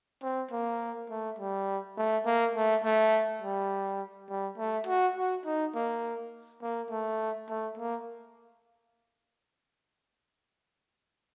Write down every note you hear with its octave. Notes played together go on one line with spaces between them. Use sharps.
C4
A#3
A3
G3
A3
A#3
A3
A3
G3
G3
A3
F#4
F#4
D#4
A#3
A#3
A3
A3
A#3